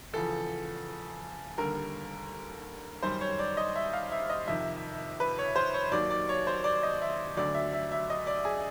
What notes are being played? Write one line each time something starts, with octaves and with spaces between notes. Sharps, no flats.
E2 C#3 F3 A4
D#2 D3 G3 A#4
F#2 D#3 G3 C5
C#5
D5
D#5
E5
F5
E5
D#5
F2 C3 D#3 E5
B4
C#5
C5
C#5
D#2 D#3 F#3 D5
D5
C#5
C5
D5
D#5
E5
D2 D3 F#3 D5
E5
E5
E5
D#5
D5
G#4